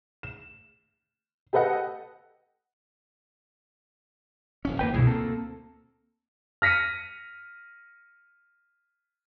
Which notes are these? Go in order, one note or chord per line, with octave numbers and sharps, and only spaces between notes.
E7
G4 A4 B4 D#5 F#5
D#1 A#1 C#4
F1 E2 D3 A#3 B4 G5
C2 G2 B2 E3 E4 G#4
D2 A#3 C4 A4
F6 A#6 B6 C#7 D#7